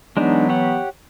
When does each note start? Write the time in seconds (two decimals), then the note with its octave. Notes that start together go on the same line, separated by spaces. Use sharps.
0.17 E3 F#3 G#3 B3 D4 D#4
0.49 G4 C#5 F#5